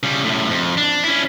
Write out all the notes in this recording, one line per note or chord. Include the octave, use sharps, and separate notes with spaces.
C#3 G3
F#2 A2
F2
D4
C#4 E4